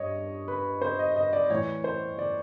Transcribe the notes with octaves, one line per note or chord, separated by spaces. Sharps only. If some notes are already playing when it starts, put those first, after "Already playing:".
Already playing: G2 C#5 D#5
B4
C5
D#5
D#5
D5
A2 E3 C#5
C5
D5